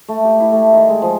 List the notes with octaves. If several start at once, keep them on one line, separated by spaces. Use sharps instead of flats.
A3
G4
E4
A3
D#3
G#3
F3